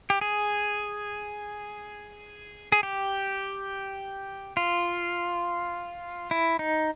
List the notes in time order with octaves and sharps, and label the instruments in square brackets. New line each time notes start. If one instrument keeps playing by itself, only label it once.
[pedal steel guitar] G4
G#4
G#4
G4
F4
E4
D#4